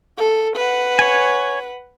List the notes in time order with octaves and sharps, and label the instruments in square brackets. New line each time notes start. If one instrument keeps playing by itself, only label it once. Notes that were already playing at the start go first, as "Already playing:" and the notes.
[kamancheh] A4
B4 F#5
[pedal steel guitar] C#5 G#5